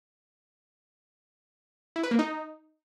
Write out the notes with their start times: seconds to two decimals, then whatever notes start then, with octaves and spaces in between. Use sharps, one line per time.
1.96 E4
2.03 B4
2.11 A#3
2.19 D#4